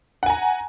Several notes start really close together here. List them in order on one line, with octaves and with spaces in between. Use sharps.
F#5 G#5 A#5